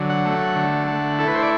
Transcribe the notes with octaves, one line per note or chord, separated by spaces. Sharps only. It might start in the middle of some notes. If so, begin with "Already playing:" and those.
Already playing: D3 F#3
F#5
A3
D3
A3
E4 A4
B4
C5
D5